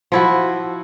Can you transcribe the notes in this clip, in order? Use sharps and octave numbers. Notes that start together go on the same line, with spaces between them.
F3 E4 F#4